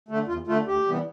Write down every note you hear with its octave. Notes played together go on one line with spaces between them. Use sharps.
D3 A3
E2 F4
D3 A3 F4
D2 G4
C3 E3 G3 B3